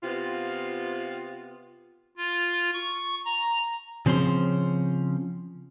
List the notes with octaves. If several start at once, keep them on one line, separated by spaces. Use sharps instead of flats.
C3 B3 F4
F4
C#6
A#5
C#3 F3 C4 C#4 C6